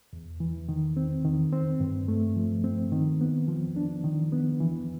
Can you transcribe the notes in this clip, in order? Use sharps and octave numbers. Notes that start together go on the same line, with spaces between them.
E2
E3
D#3
C4
D#3
C4
G2
A3
F3
C4
D#3
B3
F3
D4
D#3
B3
E3